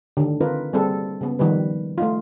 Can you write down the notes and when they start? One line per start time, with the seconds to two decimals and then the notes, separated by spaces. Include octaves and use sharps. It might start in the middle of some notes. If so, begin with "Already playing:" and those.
0.17 D3 D#3
0.41 C4 D#4 F4 A#4 B4
0.73 G3 A#3 C4 G#4 A4
1.21 C#3 B3
1.39 D#3 F3 G3 B4
1.98 A3 D#4 F4